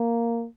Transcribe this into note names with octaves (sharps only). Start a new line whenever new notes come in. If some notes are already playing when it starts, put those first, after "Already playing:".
Already playing: A#3